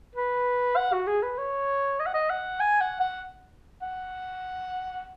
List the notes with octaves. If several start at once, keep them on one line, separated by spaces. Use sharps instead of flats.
B4
F#5
F#4
G#4
B4
C#5
D#5
F#5
D#5
F#5
G#5
F#5
F#5
F#5